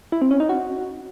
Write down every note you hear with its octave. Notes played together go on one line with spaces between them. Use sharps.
E4
C4
C#4
D#4
F#4